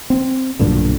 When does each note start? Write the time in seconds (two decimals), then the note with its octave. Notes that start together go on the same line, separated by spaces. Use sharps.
0.10 C4
0.59 B1 G2 A#2 D3